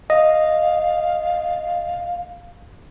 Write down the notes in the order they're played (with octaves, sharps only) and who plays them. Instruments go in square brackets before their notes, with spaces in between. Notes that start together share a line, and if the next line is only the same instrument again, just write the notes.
[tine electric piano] D#5 [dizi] F5